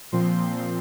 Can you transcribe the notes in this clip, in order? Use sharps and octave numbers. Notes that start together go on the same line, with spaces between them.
A#2 F3 C4 C6